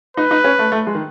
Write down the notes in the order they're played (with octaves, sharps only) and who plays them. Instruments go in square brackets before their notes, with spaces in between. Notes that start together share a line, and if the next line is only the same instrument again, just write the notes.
[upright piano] D#4 [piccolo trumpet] B4
[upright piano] D#4
C#4
A3
A3
G#3
D#3